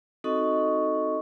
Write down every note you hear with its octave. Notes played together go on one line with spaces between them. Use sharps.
C4 D#4 F#4 A4 D#5 C#6